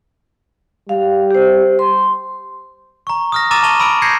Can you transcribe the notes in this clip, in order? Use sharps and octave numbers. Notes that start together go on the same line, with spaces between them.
G3 F5
G4 C5
C6
A#5 C#6
D#6 F6 A#6
A#5 D6 E6 A6 D#7 E7
A5 C#6 D#7 F7 G7
B5 E6 D7
G6 G#6 A#6 C7 C#7